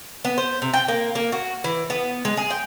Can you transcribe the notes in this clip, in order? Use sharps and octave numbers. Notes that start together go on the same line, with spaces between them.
B3
C5
C3
G5
A#3
A#3
F#4
E3
B3
G#3
G#4
G5